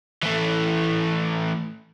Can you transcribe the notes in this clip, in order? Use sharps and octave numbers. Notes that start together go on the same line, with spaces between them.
E3 A3